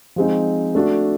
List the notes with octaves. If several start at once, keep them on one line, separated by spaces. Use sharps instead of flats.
F3 G#3 C4 D#4
A3 D4 F#4